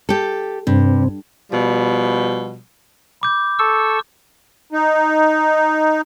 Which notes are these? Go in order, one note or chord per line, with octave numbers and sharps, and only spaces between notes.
G4 A4
G2 C3 C4
B2 F3 G3
B5 D6 G6
A4 C#6 E6
D#4